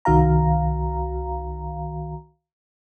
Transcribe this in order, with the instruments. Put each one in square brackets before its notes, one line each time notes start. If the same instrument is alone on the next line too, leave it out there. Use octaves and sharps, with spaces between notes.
[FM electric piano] C2 D#3 F#4 F5 A#5